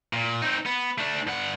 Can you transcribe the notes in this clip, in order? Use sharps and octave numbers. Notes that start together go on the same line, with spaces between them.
A#2
C4 D#4
B3
A3 D4
G2 F#5